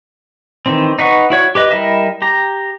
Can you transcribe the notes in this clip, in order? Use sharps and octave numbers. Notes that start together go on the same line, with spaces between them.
D#3 E3 C4
D#4 B4 F#5 C#6
E4 F#4 C#5
G4 B4 D#5
G3 E4 A#4 D#5 E5
G4 A#5